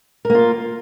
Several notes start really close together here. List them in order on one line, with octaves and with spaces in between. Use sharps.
A#4 A#3 F4